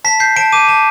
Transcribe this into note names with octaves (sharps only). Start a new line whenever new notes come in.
A5 B6
G6 C7
A5 D7
D6 D#7
A5